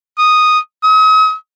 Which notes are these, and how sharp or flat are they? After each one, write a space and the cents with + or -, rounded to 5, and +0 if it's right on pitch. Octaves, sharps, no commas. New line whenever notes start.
D#6 -5
D#6 +40